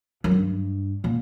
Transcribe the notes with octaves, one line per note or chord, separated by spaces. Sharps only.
F#2
G2
A#2